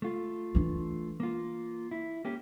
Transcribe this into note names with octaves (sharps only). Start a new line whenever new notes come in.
A3 F4
E3 D4
A#3 F4
E4
A#3 C#4 G4